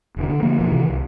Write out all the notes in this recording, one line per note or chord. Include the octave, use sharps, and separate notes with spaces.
E1 D3
D3
D3 F3 A#3
F#1 B2 F3
C3 D#3 E3
C2